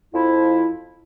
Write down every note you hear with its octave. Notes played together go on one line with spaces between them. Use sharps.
F2 F3 E4